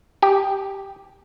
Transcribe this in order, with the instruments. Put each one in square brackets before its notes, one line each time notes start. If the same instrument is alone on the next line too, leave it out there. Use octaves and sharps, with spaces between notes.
[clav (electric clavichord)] G4